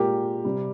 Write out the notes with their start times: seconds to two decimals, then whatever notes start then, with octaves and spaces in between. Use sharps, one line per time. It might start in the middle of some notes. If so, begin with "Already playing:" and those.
Already playing: A#2 G#3 G4 A#4
0.45 C3 G3